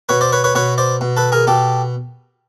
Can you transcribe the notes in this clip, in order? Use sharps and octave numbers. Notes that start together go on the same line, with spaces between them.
B2 B4 C#5
C5 D5
B4 C#5
B4 C#5
B2 B4 C#5
C5 D5
B2
A4 B4
G#4 A#4
B2 G4 A4